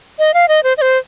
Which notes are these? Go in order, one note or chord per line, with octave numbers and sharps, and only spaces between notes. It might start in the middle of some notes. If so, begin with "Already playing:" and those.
D#5
F5
D#5
C5
D#5
C5